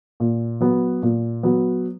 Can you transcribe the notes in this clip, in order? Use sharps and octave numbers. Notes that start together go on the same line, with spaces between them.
A#2
F#3 B3
A#2
F#3 B3